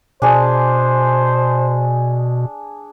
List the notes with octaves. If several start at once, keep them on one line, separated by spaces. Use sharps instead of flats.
B2 D4 G#4 C5